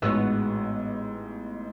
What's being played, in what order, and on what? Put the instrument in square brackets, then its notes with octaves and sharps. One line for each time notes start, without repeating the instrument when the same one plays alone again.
[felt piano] A1 G#2 E6 [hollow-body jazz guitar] G#3 [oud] B3 F#4 C#5